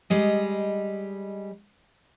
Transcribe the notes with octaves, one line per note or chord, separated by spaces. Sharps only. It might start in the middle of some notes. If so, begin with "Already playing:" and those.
G3 G#3 D#5